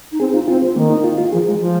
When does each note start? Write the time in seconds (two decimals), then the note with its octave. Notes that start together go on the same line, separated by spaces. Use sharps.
0.12 D#4
0.20 C4 G#4
0.34 D#4 F4
0.48 C4 F4
0.62 C4
0.76 D#3 A#3
0.90 D#4
1.04 F4
1.18 F4
1.32 F3 G#4
1.47 G#3
1.60 F3